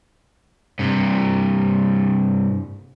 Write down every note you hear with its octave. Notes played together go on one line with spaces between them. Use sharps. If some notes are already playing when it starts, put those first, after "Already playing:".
G2 C3